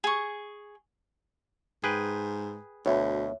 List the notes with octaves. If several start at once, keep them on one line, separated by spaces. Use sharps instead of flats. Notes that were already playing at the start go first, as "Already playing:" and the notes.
G#4 C#6
G#2 G#4 B4 G5
D2 B2 C#5 E5